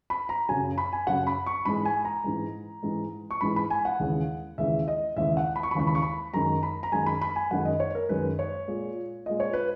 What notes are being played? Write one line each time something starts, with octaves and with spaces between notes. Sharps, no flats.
B5
A#5
F#2 C#3 F#3 G#5
B5
G#5
F#2 C#3 F#3 F#5
B5
C#6
G#2 E3 G#3 B5
G#5
A#5
G#2 E3 G#3
G#2 E3 G#3
C#6
G#2 E3 G#3 B5
B5
G#5
F#5
D#2 C#3 E3 G#3
D#2 C#3 E3 G#3 E5
D#5
D#2 C#3 E3 G#3 E5
F#5
B5
C#6
B5
D#2 C#3 E3 G#3 C#6
B5
C#6
B5
F#2 D#3 G#3 A#5
B5
A#5
F#2 D#3 G#3 G#5
B5
B5
G#5
F#2 D#3 G#3 F#5
D#5
C#5
A#4
F#2 D#3 G#3 B4
C#5
A#2 G#3
A#2 G#3 D#5
C#5
B4